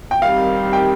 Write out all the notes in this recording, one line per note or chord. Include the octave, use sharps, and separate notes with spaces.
G5
D#3 G3 C4 F5
G5